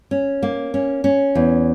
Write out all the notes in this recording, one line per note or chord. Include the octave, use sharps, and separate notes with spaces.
C#4
A#3
C#4
C#4
E2